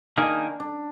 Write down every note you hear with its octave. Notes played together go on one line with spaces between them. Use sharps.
D#3 A#3 D4 D#4 G#4
D4